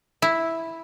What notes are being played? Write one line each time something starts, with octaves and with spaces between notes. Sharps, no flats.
E4